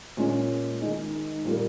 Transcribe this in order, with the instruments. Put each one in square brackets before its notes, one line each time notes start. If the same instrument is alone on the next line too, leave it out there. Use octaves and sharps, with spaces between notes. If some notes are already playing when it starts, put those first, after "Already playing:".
[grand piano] A#2 G#3 C#4
D#3 G#3 D#4
A#2 G3 A#3